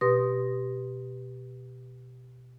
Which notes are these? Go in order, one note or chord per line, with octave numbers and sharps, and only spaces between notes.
B2 G4 B4 C6 D#6 A#6